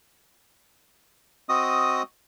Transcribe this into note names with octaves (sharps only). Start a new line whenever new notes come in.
C4 F#4 D#5 D#6